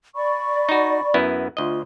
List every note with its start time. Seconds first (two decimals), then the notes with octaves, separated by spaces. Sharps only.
0.15 D5 B5 C#6
0.69 D#4 F#4
1.14 F#2 B3 E4
1.57 D2 F4 D#5